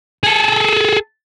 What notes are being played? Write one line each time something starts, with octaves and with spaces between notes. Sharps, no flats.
G#4 A4